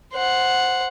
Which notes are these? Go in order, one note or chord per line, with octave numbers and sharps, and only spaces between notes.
C5 F#5